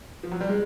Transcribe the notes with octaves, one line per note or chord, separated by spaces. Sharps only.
F3
F#3
G3
G#3